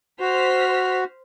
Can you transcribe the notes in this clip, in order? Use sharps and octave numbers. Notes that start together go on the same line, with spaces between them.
F#4 C5 F6 B6